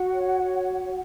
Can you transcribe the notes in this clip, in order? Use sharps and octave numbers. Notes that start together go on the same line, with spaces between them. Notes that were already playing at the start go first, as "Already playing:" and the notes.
Already playing: F#4 F#5
C#5
C#5